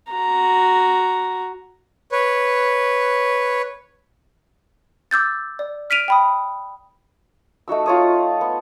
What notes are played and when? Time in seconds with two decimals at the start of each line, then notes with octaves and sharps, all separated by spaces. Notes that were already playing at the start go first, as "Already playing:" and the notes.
0.11 F#4 A#5
2.12 B4 C#5
5.11 D6 E6 G6 A6
5.59 D5
5.90 F6 B6 D7 D#7 F7
6.08 G5 B5 D#6
7.68 A3 D#4 F#4 E6
7.86 F4 C#5 D#5
8.41 B3